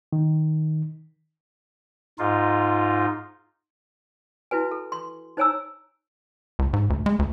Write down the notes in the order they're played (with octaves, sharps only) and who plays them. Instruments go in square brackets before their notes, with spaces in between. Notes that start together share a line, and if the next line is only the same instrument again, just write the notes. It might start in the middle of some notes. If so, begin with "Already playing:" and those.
[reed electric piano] D#3
[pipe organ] G#2 D#4 F4
[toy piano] E4 F#4 B4 G#5
A4
C6
D#4 C5 C#5 G#5 A#5 E6
[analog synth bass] C#2
G#2
D2
G#3
D2